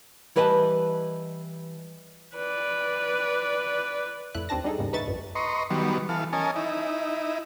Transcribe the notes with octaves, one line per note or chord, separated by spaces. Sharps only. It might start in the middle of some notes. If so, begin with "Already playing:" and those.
E3 G3 B4 D#5 G#5 A5
B4 D5
F2 A2 E4 F#6
D#2 C4 D4 A5 A#6
G3 D4 D#4 G#4 A4
D#2 G#2 C#3 G3 A#3
D#2 D#4 B4 E5 C#6 A6
A#1 F#2
B4 D#5 A#5 C6 C#6
D#3 F#3 G3 B3
E3 A4 F5
C#4 A#4 D#5 G#5 A5
D#4 E4